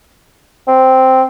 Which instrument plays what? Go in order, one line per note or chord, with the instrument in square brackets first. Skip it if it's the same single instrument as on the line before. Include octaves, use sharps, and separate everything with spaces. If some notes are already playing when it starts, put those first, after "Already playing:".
[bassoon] C4